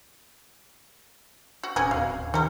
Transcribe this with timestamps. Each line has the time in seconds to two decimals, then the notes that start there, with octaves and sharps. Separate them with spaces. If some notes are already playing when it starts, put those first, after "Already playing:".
1.63 F#4
1.76 D#1 C#4 F#4 G#4
1.91 D1 F5
2.34 D#3 G3 A#4